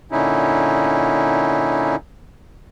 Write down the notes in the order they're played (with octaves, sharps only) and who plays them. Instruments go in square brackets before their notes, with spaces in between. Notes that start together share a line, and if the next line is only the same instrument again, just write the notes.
[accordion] A#2 D3 C#4 D#4 E4